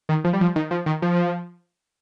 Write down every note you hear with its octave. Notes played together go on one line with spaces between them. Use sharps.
D#3
F3
G3
F3
D#3
F3
D#3
F3